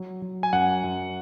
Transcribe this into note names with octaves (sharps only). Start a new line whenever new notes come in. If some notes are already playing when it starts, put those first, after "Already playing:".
Already playing: F#3
F#3
G#5
F#2 F#5
F#2